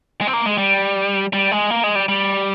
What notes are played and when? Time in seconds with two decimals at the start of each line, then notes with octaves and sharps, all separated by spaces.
0.21 G#3
0.27 C4
0.33 A#3
0.46 G#3
0.58 G3
1.33 G3
1.52 G#3
1.70 A#3
1.84 G#3
1.95 G3
2.08 G3